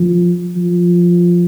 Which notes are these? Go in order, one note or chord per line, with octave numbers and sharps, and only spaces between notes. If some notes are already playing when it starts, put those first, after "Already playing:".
Already playing: F3
F3